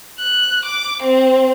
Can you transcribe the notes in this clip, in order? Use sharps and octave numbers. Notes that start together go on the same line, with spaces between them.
F#6
D6
C4